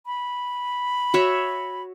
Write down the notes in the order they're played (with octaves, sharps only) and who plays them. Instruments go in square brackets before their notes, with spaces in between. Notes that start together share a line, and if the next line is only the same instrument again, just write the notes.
[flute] B5
[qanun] F#4 C#5 E5